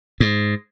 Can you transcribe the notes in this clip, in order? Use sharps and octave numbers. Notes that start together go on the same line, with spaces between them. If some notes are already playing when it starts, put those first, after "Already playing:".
G#2